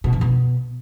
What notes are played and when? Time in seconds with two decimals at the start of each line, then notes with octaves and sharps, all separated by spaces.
0.04 B2
0.13 F2
0.21 B2